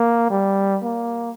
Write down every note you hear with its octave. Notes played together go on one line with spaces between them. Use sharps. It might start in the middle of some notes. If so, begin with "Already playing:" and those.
Already playing: A#3
G3
A#3